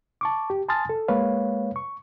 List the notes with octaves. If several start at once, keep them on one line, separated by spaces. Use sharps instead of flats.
A5 C#6 D6
G4
G#5 A5 C6 D#6 F6 A6
A4
G#3 A#3 B4 C#5 F5
C#6